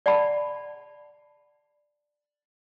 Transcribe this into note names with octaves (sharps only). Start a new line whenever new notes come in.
D5 F#5 A5 B5